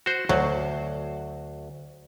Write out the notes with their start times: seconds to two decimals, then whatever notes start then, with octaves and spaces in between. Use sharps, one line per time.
0.06 F#4 C5
0.29 D2 F#3